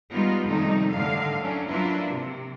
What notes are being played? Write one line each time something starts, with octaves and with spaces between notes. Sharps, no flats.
G3 G#3 B3 D#4 F4
F2 C3 D#3 G3 A3 D#4
A2 D3 D#3 F5
F#3 A3 C#4 D4
F#3 A#3 D4 E4 F4 B4
C3